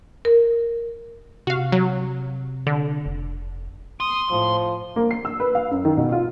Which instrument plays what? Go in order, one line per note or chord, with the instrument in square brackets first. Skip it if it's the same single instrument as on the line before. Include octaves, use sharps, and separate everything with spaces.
[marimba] A#4
[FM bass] C3 [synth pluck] F#4 F5
[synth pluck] F#3
D3
[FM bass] F1
[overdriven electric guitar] C6 [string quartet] D#6
[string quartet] A2 [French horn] F3
[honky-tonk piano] A#3
C7
E6
B4
F5
F#2
D#3
B2
F4